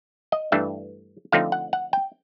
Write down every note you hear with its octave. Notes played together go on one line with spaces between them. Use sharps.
D#5
G2 E3 A3 D4 E5
D3 F3 A3 C4 D#4 F5
F#5
F#5
G5